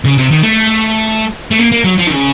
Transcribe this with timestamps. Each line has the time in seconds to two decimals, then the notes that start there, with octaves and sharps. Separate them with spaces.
0.05 C#3
0.18 C3
0.31 D#3
0.43 A3
1.51 A3
1.59 A#3
1.72 A#3
1.84 F#3
1.98 F3
2.07 D#3
2.10 C#3